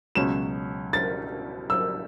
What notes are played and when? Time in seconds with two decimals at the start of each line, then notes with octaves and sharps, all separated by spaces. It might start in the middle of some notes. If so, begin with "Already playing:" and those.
0.15 C#2 B2 F#3 C#4 E7
0.93 A6
1.70 E6